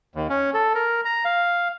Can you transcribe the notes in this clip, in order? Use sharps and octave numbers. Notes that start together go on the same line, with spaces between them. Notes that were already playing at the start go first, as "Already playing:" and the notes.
D#2
C#4
A4
A#4
A#5
F5